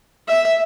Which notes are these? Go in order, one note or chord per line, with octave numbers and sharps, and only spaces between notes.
E5